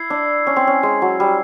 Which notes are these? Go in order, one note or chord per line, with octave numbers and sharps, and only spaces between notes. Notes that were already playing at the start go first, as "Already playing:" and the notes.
Already playing: E4 E6 G#6 C7
D4
C#4
C4
C#4
G#3
F#3
G3